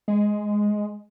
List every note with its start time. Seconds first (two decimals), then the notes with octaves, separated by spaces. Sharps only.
0.08 G#3